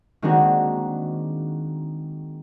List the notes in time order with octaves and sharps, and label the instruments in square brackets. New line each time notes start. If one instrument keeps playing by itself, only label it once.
[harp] D#3 G#3 A#3 C4 D4 F#4